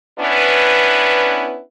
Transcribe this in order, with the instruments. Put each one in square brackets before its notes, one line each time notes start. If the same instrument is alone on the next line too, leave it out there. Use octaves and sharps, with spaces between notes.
[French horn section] B3 C#4 D4 E4 B4